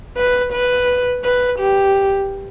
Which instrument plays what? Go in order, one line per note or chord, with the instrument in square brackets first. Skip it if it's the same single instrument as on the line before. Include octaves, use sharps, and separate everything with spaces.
[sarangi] B4
B4
B4
G4